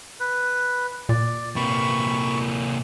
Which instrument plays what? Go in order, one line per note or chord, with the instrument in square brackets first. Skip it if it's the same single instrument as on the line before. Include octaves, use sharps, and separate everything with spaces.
[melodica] B4
[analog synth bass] A#2 [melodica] D5
[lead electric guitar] C3 A#3 [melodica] B5 C#6